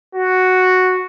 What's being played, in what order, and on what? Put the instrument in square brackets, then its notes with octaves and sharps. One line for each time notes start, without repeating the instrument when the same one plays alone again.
[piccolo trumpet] F#4